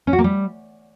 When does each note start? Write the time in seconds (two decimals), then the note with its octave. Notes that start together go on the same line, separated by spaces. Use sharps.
0.07 C#4
0.13 F#4
0.19 A#3
0.24 G3